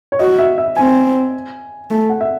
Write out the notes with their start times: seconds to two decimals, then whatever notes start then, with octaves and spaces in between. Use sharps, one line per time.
0.12 C#5
0.19 F#4 D#5
0.39 E5
0.58 E5
0.76 C4 G#5
1.90 A3
2.09 F#5
2.21 E5